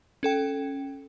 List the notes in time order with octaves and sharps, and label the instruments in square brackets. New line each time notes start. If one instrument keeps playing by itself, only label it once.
[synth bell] C#4 A4 G5